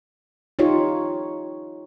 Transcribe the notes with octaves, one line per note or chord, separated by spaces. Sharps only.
D#4 F4 G4 C#5